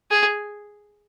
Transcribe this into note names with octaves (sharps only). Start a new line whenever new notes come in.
G#4